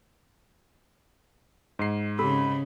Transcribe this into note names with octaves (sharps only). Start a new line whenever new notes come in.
G#2 C7
C#3 C4 G4 A4 B5